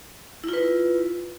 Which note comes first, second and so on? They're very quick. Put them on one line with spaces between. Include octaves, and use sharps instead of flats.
E4 F4 B4